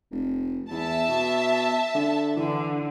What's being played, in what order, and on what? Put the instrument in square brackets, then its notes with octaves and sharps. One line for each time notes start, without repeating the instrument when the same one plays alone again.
[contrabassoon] F1
[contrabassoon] E2 [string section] E5 A5
[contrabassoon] B2
D3
[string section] D3 [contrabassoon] E3